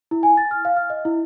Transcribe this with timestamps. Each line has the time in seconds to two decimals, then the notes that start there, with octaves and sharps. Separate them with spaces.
0.11 E4
0.23 G#5
0.37 A6
0.51 F6
0.65 F5
0.77 F6
0.90 D#5
1.05 E4